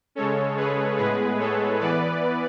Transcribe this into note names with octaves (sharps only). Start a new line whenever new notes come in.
C#3 G#3 C#4 A4 C#5
G#4 B4
A2 G#3 B3 G#4 B4
A4 C#5
E3 B3 B4 D5